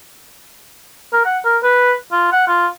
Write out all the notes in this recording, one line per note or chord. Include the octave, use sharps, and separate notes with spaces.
A#4
F#5
A#4
B4
F4
F#5
F4